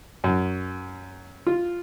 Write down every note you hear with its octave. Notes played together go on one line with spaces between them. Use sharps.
F#2
F4